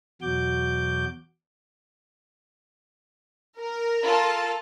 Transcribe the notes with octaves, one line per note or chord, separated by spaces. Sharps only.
E2 B2 F#3 F#4 D6 G6
A#4
F4 A4 A5